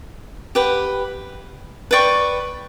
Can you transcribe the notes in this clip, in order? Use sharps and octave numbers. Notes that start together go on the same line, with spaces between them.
G4 B4 F#5
B4 D5 G5 C#6